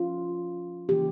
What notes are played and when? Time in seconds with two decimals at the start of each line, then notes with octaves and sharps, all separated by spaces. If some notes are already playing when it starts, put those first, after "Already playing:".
Already playing: F3 C#4 F4
0.89 C#3 E3 A#3 C#4 G4